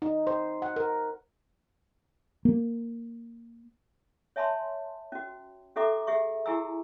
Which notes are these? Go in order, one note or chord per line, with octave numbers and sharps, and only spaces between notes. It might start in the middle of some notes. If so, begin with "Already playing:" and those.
D#4
C5
F#5
A#4
A#3
C#5 E5 G#5 A5 B5 C6
C#4 F#4
C#4 G4 A4 E5 A#5 D6
G4 G#4 E5 C#6
E4 G4 G#4 G#5 A#5 E6